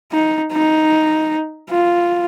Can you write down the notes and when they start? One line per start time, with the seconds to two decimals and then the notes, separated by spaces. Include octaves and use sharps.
0.12 D#4
0.52 D#4
1.70 F4